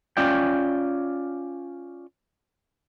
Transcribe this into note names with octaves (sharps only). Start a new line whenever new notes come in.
C#4 F4 D5 G5